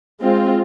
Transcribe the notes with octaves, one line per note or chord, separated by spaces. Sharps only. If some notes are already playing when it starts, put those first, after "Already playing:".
G#3 C4 F4